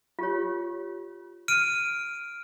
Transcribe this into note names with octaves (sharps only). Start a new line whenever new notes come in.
F4 G4 C#5
F6 D7 D#7